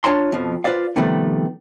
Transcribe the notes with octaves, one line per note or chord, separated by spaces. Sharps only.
D4 F4 C#5 A5 A#5 C6
F2 B2 F3
F4 B4 C5 D5 F5
C3 D#3 F3 G3 A3 B3